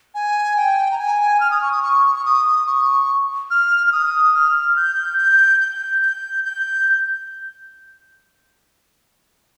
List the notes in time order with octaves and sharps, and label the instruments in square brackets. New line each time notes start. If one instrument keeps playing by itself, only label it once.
[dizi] G#5
G5
A#5
G#5
F6
D#6
C#6
D#6
C#6
C#6
D#6
C#6
F6
F6
D#6
F6
G6
G6
G6
G6
G6